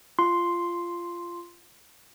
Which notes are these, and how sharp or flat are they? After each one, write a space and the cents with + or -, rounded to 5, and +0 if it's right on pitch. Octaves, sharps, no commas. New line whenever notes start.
F4 -15 C6 +0